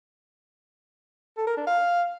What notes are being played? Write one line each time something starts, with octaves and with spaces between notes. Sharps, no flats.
A4
A#4
D4
F5